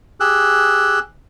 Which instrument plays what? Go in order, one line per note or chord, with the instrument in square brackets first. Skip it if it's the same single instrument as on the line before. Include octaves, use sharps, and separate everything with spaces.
[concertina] G4 G#4 E6 F#6